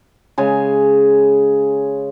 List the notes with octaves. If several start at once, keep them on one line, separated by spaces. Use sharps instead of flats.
C#3 G#3 G#5